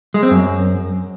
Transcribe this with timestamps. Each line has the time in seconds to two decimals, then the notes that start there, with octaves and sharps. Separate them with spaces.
0.14 G#3
0.23 C4
0.31 F#2